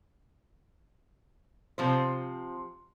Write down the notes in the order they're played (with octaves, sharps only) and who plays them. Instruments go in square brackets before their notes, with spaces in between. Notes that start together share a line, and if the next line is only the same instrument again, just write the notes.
[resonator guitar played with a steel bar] C3 F3 C5